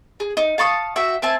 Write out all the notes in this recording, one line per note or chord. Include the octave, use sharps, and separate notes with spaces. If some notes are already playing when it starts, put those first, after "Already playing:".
G#4
D#4
F5 A5 C#6 D#6
F#4 E5 G5
C4 E5 G#5 A5